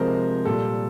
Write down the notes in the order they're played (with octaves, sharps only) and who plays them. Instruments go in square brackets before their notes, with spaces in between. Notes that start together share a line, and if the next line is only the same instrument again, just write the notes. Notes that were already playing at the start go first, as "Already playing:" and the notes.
Already playing: [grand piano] C3 F3 G#3 A#4 C5
A#2 G3 A4